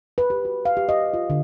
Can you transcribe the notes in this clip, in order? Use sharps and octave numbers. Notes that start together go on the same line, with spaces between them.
B4
G4
F#4
F5
G4
D#5
F4
D3